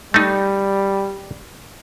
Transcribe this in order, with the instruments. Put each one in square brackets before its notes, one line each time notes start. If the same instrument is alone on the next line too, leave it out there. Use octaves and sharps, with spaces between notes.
[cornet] G3 [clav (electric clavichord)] A3 D#4